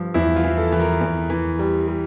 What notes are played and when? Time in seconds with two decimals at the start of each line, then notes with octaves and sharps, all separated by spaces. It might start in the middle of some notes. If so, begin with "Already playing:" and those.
Already playing: G2 F3
0.14 E2 E4
0.36 F4
0.44 E3
0.58 A4
0.72 E3
0.80 A#4
1.01 E2
1.30 E3
1.59 G3
1.88 G3